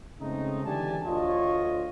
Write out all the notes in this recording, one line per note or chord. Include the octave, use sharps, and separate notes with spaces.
C#3 G#3 A3 C4 D#4
D3 E3 G4 D5 G#5 A5
D2 F4 C#5 D#5